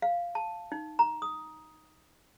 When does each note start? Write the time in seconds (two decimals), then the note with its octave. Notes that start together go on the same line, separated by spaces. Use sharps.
0.02 F5
0.35 A5
0.72 D#4
0.99 A#5
1.22 D#6